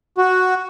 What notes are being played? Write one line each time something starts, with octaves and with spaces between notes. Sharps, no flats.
F#4